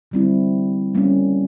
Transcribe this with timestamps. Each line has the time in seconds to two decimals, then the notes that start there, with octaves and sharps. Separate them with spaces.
0.11 D3 G3 C4 E4
0.95 G3 A#3 C#4